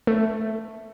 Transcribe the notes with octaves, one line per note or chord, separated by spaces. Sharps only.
A3